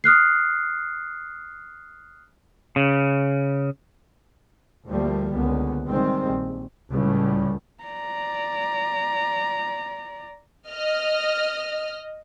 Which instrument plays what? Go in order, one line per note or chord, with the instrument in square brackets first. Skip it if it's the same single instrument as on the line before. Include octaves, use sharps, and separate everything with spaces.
[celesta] D#6 F6 F#6 C7
[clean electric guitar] C#3
[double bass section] D2 F3 G3 A3 A#3
C#2 D3 A#3 B3
D#3 G3 G#3 C4
A#1
[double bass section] C#2 A2 [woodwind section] G3
[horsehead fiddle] D5 A#5
[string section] D#5 F6